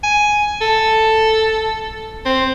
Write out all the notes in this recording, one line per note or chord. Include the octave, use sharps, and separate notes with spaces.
G#5
A4
C4